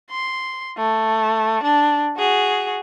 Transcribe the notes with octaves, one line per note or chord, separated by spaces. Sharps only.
C6
A3
D4
F#4 G#4